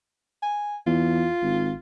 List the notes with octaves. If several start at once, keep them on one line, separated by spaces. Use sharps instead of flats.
G#5
E2 F4
G#1